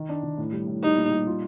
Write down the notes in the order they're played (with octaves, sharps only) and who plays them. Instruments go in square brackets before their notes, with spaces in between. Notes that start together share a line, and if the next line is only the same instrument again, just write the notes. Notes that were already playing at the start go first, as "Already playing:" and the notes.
Already playing: [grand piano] D#3
D4
D#3
A2
G3
A2
[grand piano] G3 [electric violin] D#4
[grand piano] A#2
G3
F4